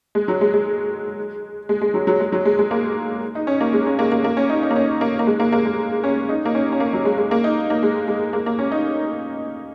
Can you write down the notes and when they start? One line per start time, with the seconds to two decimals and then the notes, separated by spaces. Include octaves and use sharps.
0.15 G#3
0.28 F#3
0.41 G#3
0.54 G#3
1.69 G#3
1.81 G#3
1.94 F#3
2.07 F#3
2.20 G#3
2.32 F#3
2.45 G#3
2.59 G#3
2.71 A#3
3.35 D#4
3.47 C#4
3.60 A#3
3.73 G#3
3.86 C#4
3.99 A#3
4.12 A#3
4.24 A#3
4.37 C#4
4.49 D#4
4.63 D#4
4.70 A#3
4.76 C#4
5.01 A#3
5.19 A#3
5.27 G#3
5.40 A#3
5.52 A#3
5.65 G#3
6.04 C#4
6.29 D#4
6.45 A#3
6.55 C#4
6.72 C#4
6.80 A#3
6.93 F#3
7.05 G#3
7.18 G#3
7.31 A#3
7.44 D#4
7.70 A#3
7.83 G#3
8.08 G#3
8.33 A#3
8.46 A#3
8.59 C#4
8.72 D#4